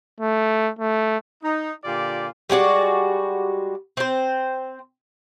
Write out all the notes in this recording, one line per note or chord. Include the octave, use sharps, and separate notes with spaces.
A3
A3
D#4
A#2 D3 F4 G4 D5
G3 G#3 F#4 D5
C4 C5